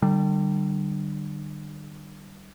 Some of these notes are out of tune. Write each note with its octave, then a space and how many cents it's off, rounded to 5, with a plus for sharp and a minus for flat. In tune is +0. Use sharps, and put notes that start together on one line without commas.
D3 +40 G3 -15